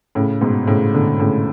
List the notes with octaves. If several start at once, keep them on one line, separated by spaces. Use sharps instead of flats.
A2 C#3
G#2 B2
A2 C#3
B2 D3
A2 C#3